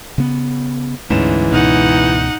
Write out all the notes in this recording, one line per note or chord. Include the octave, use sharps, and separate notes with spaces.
C#3 B3
D2 G#2 E3 C#4 E7
C#2 B2 D#4 F#5